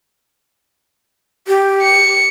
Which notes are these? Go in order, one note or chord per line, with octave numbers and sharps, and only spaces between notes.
G4
C#7